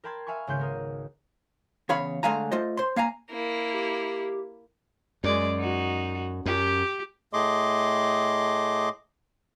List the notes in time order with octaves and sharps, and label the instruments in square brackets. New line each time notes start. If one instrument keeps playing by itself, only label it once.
[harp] A#4 G5 A5 B5 C6 G#6
E5 F5 G#5 B5 C#6
G#1 C#2 C#3 B3 C6 G6
B3 A#4 D#6
[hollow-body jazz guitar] E2 C#3 C#5 F5 B5
D3 G#3 A3 F5 G#5 A#5
A3 F4 C5 D#5
C5 C6
A#3 F5 G#5 A#5
[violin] A#3 E4
[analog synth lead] G4
[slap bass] F#2 [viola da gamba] G#3 D5
[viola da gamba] D#4 F#4
[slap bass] F#2 [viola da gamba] G4
[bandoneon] A2 A3 G#4 D#5 C6 D6